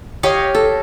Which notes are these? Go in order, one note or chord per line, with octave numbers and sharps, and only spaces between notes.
G4 C#5 D#5 F5
A4